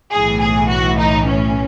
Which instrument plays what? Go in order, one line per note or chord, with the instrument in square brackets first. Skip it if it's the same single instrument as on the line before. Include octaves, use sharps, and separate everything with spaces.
[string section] B1 A2 E3 G#4
G#4
F#4
D#4
C#4